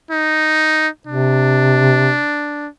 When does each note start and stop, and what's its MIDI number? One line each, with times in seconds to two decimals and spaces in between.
0.11 0.88 63
1.07 2.18 48
1.07 2.68 62